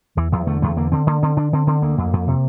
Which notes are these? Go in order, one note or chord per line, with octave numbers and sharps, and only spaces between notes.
E2 E3
E2 F3
D3 A3
E2 A3
D3 A#3
D3 C4
D3 A#3
D3 C4
D3 D4
D3 C4
D3 C4
D2 A#3
F2
F2
C3